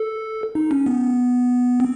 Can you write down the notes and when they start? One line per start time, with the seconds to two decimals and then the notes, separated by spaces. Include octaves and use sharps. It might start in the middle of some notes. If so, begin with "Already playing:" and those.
Already playing: A4
0.55 D#4
0.71 C#4
0.86 B3
1.80 C4